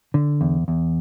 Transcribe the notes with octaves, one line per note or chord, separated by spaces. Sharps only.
D3
E2
E2